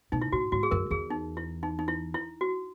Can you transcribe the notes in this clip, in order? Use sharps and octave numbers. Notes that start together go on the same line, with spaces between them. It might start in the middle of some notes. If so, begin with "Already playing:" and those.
B2 D#4
E4
A#2 F#4
G#2 F#4
G#4
F#2 A#4
E2 G#4
D#4
E4
D#4
D#4
E4
E4
F#4